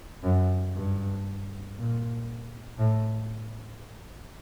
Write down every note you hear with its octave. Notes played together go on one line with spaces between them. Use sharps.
F#2
G2
A#2
A2